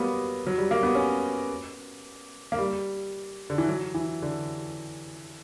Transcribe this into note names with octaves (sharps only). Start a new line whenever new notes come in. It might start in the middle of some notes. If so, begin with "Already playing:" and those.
Already playing: F#3 G3 A#3 B3
F#3
G3
A#3
B3
C#4
A#3
G3
D3
E3
F#3
E3
D3